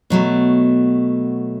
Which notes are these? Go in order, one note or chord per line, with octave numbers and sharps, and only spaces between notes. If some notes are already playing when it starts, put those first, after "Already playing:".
B2 F#3 A3